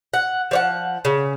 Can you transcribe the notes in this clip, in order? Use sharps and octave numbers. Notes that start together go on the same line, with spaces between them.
F#5
F3 C#5 F#5
C#3